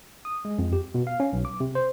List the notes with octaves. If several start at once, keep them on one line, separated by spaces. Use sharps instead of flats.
D#6
G#3
F2
G4
B2
F5
C#4
B1
D6
C3
C5